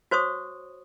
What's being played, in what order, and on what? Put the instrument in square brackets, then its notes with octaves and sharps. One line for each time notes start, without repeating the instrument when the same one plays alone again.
[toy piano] F#4 C5 C#5 C#6 D#6